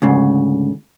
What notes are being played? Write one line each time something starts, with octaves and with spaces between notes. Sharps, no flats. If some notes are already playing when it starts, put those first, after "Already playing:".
D2 G#2 C#3